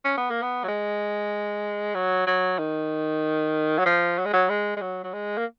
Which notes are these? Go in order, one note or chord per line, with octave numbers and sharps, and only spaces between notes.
C#4
B3
A#3
B3
F#3
G#3
F#3
F#3
D#3
F#3
F3
F#3
G#3
F#3
G#3
G#3
F#3
F#3
G#3
A#3